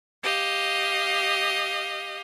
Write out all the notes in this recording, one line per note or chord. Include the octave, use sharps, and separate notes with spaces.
G4 D#5 F5